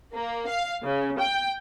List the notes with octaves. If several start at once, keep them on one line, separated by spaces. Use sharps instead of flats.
A#3
F5
C#3
G5